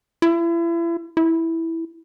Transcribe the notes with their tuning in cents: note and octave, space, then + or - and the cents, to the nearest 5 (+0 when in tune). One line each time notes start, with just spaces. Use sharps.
E4 +35
E4 -5